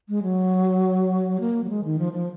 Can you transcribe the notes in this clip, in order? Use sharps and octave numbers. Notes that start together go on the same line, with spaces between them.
G#3
F#3
A#3
F#3
G#3
D#3
F3
F3